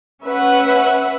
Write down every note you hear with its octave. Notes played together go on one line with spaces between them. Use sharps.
C#4 B4 E5 F#5